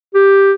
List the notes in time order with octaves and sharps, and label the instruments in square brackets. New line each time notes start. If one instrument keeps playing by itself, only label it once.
[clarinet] G4